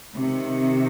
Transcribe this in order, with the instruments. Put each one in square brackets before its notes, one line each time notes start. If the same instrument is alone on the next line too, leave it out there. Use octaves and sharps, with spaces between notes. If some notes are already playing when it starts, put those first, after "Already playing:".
[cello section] C3 D#3